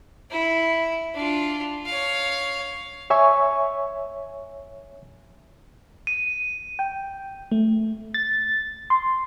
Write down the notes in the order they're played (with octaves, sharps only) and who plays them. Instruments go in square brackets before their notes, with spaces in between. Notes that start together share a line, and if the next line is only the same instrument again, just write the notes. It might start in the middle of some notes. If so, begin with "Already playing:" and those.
[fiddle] E4
D4 F4
C#5 F5
[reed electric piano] C#5 E5 G#5 C#6
[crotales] D#7
[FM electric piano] G5
A3
A6
C6